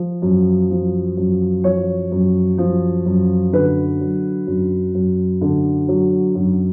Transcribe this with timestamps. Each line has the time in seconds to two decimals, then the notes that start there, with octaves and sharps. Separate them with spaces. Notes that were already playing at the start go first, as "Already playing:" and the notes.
Already playing: F3
0.22 F#2
0.70 F3
1.17 F#2
1.64 F3 C#5
2.12 F#2
2.58 F3
3.06 F#2
3.53 D3 B4
4.01 F#3
4.47 F#2
4.95 F#2
5.41 D3
5.88 F#3
6.35 F#2